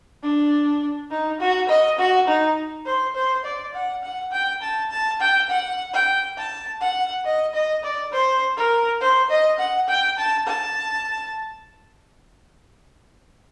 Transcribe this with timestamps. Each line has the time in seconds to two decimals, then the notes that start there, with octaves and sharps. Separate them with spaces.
0.23 D4
1.11 D#4
1.40 F#4
1.69 D#5
1.98 F#4
2.28 D#4
2.86 C5
3.15 C5
3.45 D5
3.74 F#5
4.03 F#5
4.32 G5
4.62 A5
4.91 A5
5.20 G5
5.50 F#5
5.93 G5
6.38 A5
6.81 F#5
7.25 D#5
7.54 D#5
7.84 D5
8.13 C5
8.57 A#4
9.01 C5
9.30 D#5
9.59 F#5
9.88 G5
10.18 A5
10.47 A5